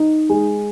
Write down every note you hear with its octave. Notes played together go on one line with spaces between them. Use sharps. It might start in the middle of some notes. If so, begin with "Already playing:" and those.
Already playing: D#4
G#3